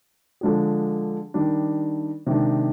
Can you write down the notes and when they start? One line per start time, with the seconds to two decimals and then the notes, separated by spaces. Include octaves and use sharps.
0.41 D3 F3 G#3 D4 G#4
1.34 D#3 G3 D4
2.27 C3 D#3 G#3 D4